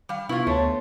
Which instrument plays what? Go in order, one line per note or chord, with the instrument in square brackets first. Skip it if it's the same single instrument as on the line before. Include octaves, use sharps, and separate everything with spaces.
[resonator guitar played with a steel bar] G3 F5
[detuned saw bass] C3 [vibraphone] B3 B4 C#6 [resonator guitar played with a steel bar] E4 F4
[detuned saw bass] D2 [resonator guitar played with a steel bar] A3 [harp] C5 C#5 A5